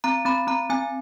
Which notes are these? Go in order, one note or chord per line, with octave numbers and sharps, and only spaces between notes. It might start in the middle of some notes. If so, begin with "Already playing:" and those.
C4 A#5
C4 B5
C4 A#5
C4 G#5